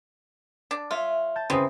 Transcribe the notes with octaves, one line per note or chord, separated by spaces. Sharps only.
D4
F4 C#5 E5 B6
A5 G6 A6
C#3 E3 C4 C5 D#6 C7